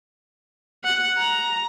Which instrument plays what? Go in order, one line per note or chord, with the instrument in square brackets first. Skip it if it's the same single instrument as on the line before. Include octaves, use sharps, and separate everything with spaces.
[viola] F#5
A#5